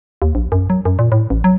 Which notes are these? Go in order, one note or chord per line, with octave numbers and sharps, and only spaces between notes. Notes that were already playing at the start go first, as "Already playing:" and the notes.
D#2
A#1
F#2
F#3
F#2
A#2
A2
A1
F#3